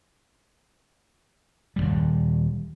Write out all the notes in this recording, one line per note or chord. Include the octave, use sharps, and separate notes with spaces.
D#1 D#2 G3